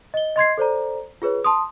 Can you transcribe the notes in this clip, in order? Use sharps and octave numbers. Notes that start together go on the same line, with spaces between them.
D#5 G7
D#5 C6 G#6 C7
A4 C5 D5 A#5
F4 G#4 B4 C#5
A5 C6 D#6